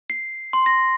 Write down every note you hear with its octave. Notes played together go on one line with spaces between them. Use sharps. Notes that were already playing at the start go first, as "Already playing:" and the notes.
C7
C6
A#6